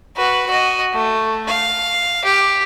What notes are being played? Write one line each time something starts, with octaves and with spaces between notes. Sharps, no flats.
F#4 B4
F#4 D#5
A3
F5
G4